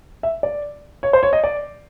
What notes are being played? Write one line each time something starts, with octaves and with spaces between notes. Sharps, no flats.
E5
D5
C#5
C5
C#5
D#5
D5